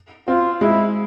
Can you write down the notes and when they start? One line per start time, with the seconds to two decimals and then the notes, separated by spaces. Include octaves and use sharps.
0.28 C4 F4
0.61 G#3 E4